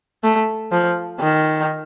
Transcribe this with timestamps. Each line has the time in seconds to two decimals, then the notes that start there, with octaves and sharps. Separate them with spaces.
0.24 A3
0.71 F3
1.20 D#3